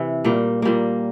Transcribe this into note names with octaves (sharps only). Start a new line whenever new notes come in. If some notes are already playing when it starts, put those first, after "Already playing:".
Already playing: C3 E3
A#2 G3 A#3
A#2 G3 A#3